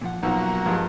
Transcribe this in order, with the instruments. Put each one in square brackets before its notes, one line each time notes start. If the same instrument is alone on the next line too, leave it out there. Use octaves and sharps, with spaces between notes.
[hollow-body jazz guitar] A#2 F3 F#5
[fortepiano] B1 F3 [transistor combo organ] F#3 A#3 [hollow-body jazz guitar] D#4
[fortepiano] G2 G#3 F4 [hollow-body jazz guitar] F3